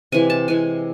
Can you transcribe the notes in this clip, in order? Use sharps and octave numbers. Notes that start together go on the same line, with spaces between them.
C3 E3 G#3 G#5
A5
C3 E3 G#3 G#5